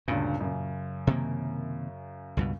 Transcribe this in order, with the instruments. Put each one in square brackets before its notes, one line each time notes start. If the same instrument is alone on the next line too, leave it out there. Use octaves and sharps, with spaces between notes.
[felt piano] D2 G2 C#3 [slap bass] A#2
[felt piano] F#2 C#3
[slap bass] C3 D#3 A#3
C#2 G2 B2